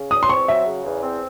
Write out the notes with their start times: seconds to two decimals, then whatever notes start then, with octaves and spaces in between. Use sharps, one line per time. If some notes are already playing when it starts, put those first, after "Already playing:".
Already playing: C#3
0.11 E2 D#6
0.23 C6
0.29 C4 C#6
0.48 F#3 E5
0.66 C#3
0.85 E2
1.03 C4